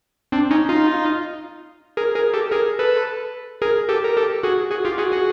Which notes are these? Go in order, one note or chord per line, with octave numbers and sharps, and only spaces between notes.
C4 D4
C#4 D#4
D#4 F4
G#4 A#4
G#4 A#4
G4 A4
G#4 A#4
A4 B4
G#4 A#4
G4 A4
A#4
G4 A4
F#4 G#4
F#4 G#4
F4 G4
F#4 G#4
F#4 G#4